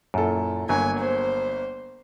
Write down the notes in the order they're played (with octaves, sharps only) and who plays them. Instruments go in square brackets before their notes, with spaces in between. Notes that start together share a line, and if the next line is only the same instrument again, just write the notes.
[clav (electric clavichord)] F#2 [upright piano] A#2 E4 A4
[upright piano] G1 A#3 [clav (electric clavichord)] F#3 [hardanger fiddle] G#5
[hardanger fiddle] C5